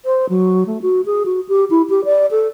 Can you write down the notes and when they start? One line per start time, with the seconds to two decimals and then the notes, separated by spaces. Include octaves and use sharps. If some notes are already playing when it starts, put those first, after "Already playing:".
0.05 C5
0.29 F#3
0.66 A3
0.82 F#4
1.06 G#4
1.26 F#4
1.49 G4
1.70 E4
1.90 G4
2.05 D5
2.31 A4